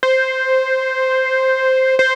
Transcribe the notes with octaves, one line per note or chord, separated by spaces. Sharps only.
C5
C5